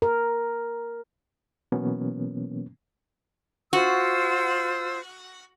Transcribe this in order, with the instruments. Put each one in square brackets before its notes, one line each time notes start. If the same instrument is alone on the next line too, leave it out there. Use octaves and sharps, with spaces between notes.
[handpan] A#4
[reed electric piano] B2 E3 F#3 A#3 B3 C#4
[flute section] F4 C5 E6 [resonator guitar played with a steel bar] F#4